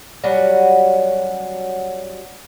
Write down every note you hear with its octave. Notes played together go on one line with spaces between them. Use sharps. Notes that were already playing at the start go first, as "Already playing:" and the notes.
F#3 G3 C#4 F#4